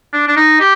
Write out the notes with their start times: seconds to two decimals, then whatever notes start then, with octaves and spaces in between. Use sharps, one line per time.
0.13 D4
0.28 D4
0.36 D#4
0.60 G4